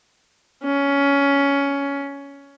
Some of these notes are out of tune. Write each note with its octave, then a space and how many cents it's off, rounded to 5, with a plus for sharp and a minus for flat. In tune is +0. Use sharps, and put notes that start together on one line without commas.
C#4 +15